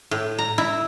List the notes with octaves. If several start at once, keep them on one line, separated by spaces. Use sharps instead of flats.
A2
A#5
E4